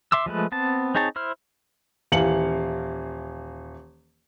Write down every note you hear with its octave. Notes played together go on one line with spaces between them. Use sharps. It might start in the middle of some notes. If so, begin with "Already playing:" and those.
E5 C6 D6 E6
F3 G#3 A3 B4
B3 C4 A5
C4 D#4 G#4 C#5 A5
E4 C5 F6
D#1 E3 F5 C#7 F#7